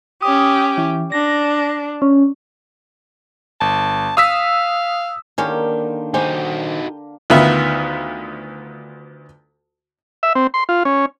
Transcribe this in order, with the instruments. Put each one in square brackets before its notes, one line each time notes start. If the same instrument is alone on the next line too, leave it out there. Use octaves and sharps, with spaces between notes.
[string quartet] C#4 G4 [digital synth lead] D#6
[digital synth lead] E3
[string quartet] D4 [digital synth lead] A#6
[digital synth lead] C#4
[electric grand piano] G1 [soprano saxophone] A5
[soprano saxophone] F5 [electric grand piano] D#6 E6 B6
[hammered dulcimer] D3 A#3 [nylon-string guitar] D#3 [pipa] G#3 C#4 G4
[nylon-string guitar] D#3 C5 G#5 [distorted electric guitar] D#4 F#4 [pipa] G4
[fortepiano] D2 D#3 B3 F4 E5 B5
[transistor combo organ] E5
C4
C6
F4
C#4